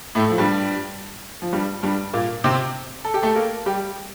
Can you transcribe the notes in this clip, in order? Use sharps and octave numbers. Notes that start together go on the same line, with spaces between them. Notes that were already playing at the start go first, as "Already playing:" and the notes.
A2 A3
F3
G2 G3
F3
G2 G3
G2 G3
A#2 A#3
C3 C4
A4
G4
A3 A4
A#3 A#4
G3 G4